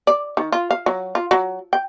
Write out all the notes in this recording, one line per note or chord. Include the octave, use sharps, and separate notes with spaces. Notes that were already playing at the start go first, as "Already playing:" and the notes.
D5
D#3
F4
F5
F#3
F4
F#3
G5